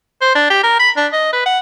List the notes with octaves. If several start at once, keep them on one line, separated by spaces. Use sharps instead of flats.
C5
D4
G4
A#4
B5
D4
D#5
B4
F#5